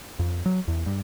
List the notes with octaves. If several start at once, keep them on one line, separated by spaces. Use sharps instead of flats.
F2
F#3
E2
G2